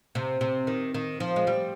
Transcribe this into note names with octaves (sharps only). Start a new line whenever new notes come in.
C3
C3
D#3
D#3
F3
G#3
G3